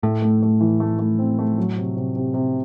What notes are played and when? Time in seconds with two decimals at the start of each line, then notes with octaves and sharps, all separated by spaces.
0.03 A2 A3
0.22 A3
0.42 A3
0.61 E3
0.80 A3
0.99 A3
1.19 C4
1.39 A3
1.58 F#3
1.76 C3
1.96 C3
2.16 C3
2.34 C3